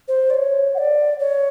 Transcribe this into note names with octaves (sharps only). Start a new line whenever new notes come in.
C5
D5
C#5
F#5
D5
C#5